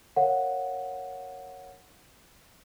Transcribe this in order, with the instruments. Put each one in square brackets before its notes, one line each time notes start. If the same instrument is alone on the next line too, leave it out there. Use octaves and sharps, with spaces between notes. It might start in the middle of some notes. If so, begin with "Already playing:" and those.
[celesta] A#4 C#5 F5 F#5